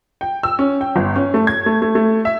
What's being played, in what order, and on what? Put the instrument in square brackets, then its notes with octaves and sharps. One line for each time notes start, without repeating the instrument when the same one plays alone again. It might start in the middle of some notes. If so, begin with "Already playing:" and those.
[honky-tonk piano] G5
E6
C#4
G5
G1
C#4
A3
G#6
A3
A3
A3
E5